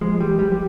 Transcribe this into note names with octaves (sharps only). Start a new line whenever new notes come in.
F3 G#3
E3 G3
F3 G3
G3